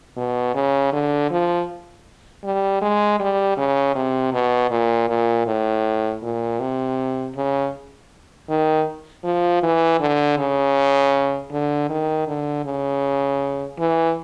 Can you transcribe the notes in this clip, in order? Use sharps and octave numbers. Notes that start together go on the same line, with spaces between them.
B2
C#3
D3
F3
G3
G#3
G3
C#3
C3
B2
A#2
A#2
A2
A#2
C3
C#3
D#3
F3
E3
D3
C#3
D3
D#3
D3
C#3
E3